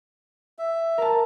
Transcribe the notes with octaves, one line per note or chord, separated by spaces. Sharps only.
E5
A#4 A5